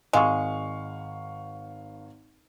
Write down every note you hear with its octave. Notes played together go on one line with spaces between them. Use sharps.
G#1 G#3 F5 C#6